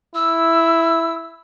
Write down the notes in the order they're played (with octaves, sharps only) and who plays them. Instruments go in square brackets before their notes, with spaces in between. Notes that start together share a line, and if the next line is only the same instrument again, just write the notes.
[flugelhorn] E4 [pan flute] E6